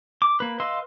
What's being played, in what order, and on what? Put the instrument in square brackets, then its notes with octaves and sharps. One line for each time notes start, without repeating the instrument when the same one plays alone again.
[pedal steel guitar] D6
A#3 B4
B4 D#5 F5 C6 E6